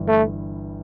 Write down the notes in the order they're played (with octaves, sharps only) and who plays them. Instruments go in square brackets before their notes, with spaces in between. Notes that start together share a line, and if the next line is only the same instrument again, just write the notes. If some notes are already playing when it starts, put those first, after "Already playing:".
Already playing: [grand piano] G1 G2 E3
[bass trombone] A3